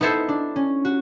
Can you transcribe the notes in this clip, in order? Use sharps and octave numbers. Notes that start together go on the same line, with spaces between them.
B3 D#4 E4 A4 C5
D4
C#4
F#4